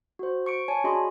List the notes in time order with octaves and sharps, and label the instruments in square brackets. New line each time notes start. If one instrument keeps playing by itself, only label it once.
[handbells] F#4 C5
C#6 C#7 D7
C#5 G#5 A5
D4 F#4 G#4 D#5 B5 C6